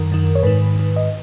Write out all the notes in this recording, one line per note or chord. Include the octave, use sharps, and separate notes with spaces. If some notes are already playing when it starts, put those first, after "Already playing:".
Already playing: F#2 D#3 A#4
F#2 D#3
C#5
G#2 D#3 B4
G#2 D#3
D#5